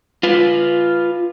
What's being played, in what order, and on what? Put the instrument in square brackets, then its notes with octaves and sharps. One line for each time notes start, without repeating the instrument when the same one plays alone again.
[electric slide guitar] F4 B4